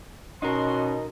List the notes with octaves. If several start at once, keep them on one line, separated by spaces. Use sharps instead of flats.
B2 C#4 D#4 F#4 A#4 C6